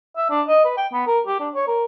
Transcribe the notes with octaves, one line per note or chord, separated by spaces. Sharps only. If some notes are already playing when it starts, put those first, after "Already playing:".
E5
D4
D#5
B4
G5
B3
A#4
G4
D4
C#5
A#4